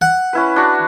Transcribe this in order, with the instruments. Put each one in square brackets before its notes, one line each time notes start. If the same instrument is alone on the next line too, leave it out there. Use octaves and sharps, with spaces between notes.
[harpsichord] F#5
[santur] C#4 E4 B4
D4 F#4